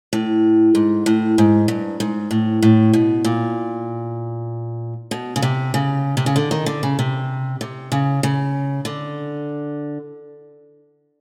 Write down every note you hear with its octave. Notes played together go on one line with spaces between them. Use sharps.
A2
G#2
A2
G#2
G2
G#2
A2
A2
B2
A#2
B2
C#3
C3
C#3
C3
C#3
D3
D#3
D3
C#3
C3
C3
C#3
C#3
D3